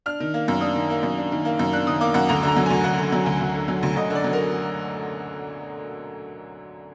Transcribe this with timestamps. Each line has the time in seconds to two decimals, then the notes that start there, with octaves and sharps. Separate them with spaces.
0.06 D4 F6
0.20 D#3
0.34 A#3
0.48 F#2
0.61 D4 D#6
0.75 D#3
0.90 A#3
1.03 F#2
1.17 D4
1.32 D#3
1.45 A#3
1.59 F#2
1.73 D4 F#6
1.87 D#3 D#6
2.01 A#3 D6
2.14 F#2 F#5
2.29 D2 A#5
2.43 D3 A#5
2.56 F#3
2.66 G#5
2.70 D2
2.84 D2 F#5
2.98 D3
3.12 F#3
3.26 D2
3.41 D2
3.55 D3
3.68 F#3
3.83 D2
3.96 D2 D#5
4.10 D3
4.15 D5
4.24 F#3
4.33 A#4